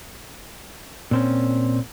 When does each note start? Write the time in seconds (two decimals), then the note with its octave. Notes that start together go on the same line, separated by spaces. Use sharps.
1.11 A#2 C4 C#4